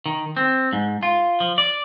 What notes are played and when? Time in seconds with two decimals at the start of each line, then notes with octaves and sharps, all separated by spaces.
0.06 D#3
0.37 C4
0.73 G#2
1.03 F4
1.40 F3
1.58 D5